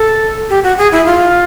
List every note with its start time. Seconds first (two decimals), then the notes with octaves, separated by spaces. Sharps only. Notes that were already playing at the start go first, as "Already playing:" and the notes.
Already playing: A4
0.50 G4
0.63 F#4
0.78 G#4
0.92 E4
1.06 F4